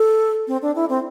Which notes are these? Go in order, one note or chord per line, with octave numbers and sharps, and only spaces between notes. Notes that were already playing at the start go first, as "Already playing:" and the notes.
Already playing: A4
C4
D4
E4
C4